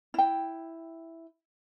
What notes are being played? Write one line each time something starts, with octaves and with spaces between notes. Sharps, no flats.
E4 G5